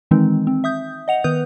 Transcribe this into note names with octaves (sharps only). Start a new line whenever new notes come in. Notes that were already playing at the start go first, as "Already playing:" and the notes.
D#3 E3 G#3 C4 D#4
C4
E5 D#6 G6
D#5 F#5 F7
D#3 B3 B4 D#6 G6